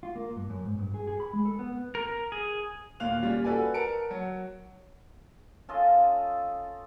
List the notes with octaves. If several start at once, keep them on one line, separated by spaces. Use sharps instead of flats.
F4
A#3
G2
F#2
G#2
G2
G#4
G#4
B5
G#3
A4
B3
A#4
G#4
D#2 A#2 F5 F#6 F7
A#2 G3 C#4 F4
F#4 A4 B4 D5 G#5
A#4 A5 C#7 D7
F#3
C#4 F4 A4 D#5